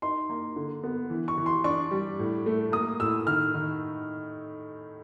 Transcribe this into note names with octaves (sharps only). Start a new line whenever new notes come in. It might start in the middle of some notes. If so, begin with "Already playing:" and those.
D#4 C6
A#3
D3
B3
E3
C#6
E3
C6
D4 C#6
G3
A2
A3
A#3 D#6
A2 E6
D#3 F6
D#3